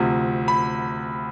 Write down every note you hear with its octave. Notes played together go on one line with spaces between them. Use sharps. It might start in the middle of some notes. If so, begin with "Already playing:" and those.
Already playing: D2 C3 F3
B5